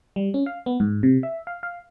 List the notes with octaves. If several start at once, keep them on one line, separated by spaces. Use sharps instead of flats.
G3
C#4
F5
B3
G#2
C3
E5
F5
F5